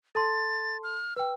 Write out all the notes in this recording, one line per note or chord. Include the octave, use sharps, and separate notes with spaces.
A4 A5 C6 A6
F6
B4 G5 E6